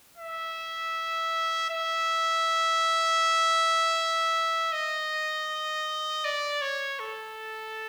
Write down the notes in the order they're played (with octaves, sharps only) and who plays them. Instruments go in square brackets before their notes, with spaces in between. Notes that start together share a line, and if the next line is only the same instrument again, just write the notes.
[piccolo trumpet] E5
E5
D#5
D5
C#5
A4